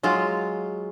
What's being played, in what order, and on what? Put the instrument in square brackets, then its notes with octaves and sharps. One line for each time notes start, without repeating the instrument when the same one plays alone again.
[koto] F#3 G#3 F4